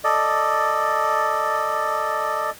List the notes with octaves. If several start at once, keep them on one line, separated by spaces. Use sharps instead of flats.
A4 D5 D#5